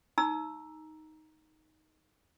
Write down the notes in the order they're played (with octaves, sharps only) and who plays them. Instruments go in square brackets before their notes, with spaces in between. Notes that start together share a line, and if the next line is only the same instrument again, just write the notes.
[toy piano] D#4 A#5 E6